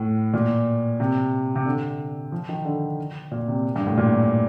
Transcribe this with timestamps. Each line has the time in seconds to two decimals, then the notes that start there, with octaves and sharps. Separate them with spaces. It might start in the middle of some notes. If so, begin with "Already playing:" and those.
Already playing: A2
0.33 A#2
1.00 C3
1.56 C3
1.66 D3
2.32 F3
2.49 D#3
2.65 D3
3.31 A#2
3.48 C3
3.76 G2
3.86 A2
3.97 A#2